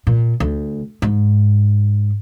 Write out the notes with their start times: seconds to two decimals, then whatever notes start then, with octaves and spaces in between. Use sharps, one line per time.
0.07 A#2
0.40 D2
1.02 G#2